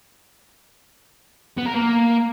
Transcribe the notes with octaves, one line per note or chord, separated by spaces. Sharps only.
B3
A#4
A#3